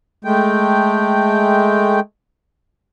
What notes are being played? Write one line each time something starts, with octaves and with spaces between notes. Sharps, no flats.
G#3 A3 G5